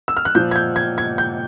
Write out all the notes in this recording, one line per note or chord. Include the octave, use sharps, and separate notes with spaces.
E6
F6
F#6
A#2 F3 G6
G#6
G6
G#6
G#6
G6